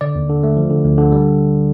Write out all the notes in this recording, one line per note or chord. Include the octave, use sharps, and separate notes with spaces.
D3 D5
D#2
D3
A3
F3
D3
D2
D3
G3